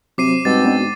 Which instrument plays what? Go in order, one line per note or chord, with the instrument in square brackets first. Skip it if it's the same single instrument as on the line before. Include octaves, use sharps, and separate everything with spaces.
[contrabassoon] C3 [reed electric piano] F#3 C5 [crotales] D6 C7 D#7
[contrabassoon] G#2 [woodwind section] B2 C4 [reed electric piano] G3 [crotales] A6
[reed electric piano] B3 D4 F#4